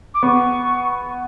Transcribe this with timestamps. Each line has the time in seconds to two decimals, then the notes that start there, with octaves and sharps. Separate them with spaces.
0.14 D6
0.23 B3 C#6